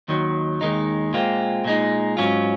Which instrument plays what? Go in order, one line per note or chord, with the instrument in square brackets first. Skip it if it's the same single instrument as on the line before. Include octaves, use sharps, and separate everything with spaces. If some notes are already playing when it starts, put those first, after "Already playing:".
[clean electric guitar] D#2 D#3 F#3
D#2 D#3 G#3 D#4
A#2 G#3 C4 F4
A#2 G#3 D#4
G#2 F#3 C#4 F4